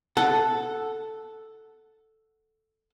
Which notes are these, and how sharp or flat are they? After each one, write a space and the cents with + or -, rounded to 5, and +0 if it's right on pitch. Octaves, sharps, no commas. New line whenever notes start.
A4 +0 F#5 +0